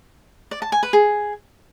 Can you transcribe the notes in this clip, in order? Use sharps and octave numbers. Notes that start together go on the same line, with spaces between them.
D5
A5
G#5
B4
G#4